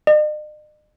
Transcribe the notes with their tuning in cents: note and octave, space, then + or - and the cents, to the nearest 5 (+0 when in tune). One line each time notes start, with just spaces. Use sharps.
D#5 -45